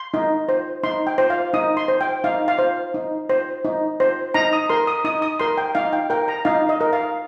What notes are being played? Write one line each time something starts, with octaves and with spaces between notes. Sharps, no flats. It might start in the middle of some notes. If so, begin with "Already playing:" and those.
Already playing: C6
D#4
C5
D#4 C6
G5
C5
F5
D#4 D#6
C6
C5
G5
D#4 F5
F5
C5
D#4
C5
D#4
C5
D#4 A#5
D#6
A#4 C6
D#6
D#4 D#6
D#6
A#4 C6
G5
D#4 F5
G5
A#4 G5
A#5
D#4 F5
D#5
A#4
F5